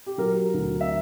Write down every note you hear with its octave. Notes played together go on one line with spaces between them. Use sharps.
G4
F#3 A#4
D2
E5